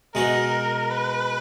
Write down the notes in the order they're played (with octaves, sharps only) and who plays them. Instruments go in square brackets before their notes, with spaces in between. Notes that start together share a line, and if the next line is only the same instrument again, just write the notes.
[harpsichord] B2 G#3 D#4 F#4 [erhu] A#4
[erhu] B4